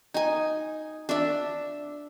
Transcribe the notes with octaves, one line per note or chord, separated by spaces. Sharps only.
D#4 G#5
D4 E5